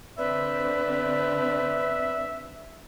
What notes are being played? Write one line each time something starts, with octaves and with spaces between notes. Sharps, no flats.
D3 C4 D4 B4 D5 E5